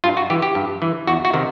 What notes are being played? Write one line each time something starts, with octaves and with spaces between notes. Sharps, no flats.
G2 F4
F#4
E3 G4
G4
G2
E3
E2 F#4
F#4
C3 D#3